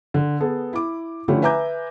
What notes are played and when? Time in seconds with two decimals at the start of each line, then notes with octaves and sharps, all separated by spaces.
0.14 D3
0.40 B3 G#4 A4
0.73 E4 D6
1.28 D3 F3 A3 C#4 E4 G4
1.42 B4 E5 G#5 A#5 D6 G6